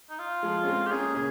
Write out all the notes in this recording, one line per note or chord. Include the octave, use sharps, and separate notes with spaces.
D#4
F4
F3 G#3
C#4
G#3 C4
G4
A#3 C#4 G#4
C#3 G#4